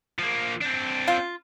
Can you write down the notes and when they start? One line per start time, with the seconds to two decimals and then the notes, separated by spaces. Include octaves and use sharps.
0.19 F3 A#3
0.61 C4 D4
1.08 F4